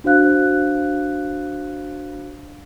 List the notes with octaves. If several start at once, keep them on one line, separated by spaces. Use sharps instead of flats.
D4 F#4 C5 F5 F#6